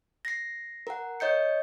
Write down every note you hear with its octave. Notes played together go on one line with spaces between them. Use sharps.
A#6 C7
A#4 F#5
C#5 D#5 G6 C#7